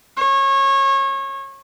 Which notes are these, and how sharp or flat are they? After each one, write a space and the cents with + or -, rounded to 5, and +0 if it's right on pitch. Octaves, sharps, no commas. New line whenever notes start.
C#5 -25